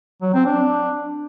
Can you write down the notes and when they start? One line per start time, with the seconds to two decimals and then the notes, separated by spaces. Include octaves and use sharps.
0.22 F#3
0.34 C4
0.46 D4